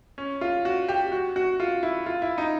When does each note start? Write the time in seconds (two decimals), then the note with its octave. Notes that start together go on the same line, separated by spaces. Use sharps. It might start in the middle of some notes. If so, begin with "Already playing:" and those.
0.18 C#4
0.41 F4
0.65 F#4
0.88 G4
1.12 F#4
1.36 F#4
1.60 F4
1.83 E4
2.06 F4
2.22 E4
2.38 D#4